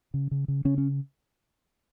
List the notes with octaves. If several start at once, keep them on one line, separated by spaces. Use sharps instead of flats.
C#3
C#3
C#3
C#3 C#4
C#4